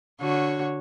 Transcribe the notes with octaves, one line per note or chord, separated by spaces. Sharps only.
D3 F#4 C#5